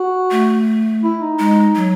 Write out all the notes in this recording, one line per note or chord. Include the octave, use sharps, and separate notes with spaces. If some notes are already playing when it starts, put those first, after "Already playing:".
Already playing: F#4
A3
E4
D#4
G#3
F#3